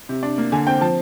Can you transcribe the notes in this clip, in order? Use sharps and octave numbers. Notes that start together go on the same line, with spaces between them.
C3
D4
A#3
D3 G#5
C4 G5
F3 A5